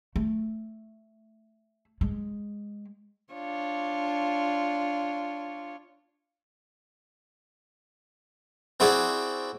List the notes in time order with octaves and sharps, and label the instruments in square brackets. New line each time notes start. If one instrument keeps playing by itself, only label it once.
[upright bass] A3
G#3
[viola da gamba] D4 F4 C#5
[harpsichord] C4 E4 F#4 G#4 D5